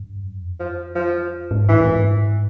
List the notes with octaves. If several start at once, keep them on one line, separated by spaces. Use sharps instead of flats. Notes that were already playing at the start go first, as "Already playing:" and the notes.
Already playing: G2
F#2
F2
F3
F3
G#2
A2 E3
A2
G2
G#2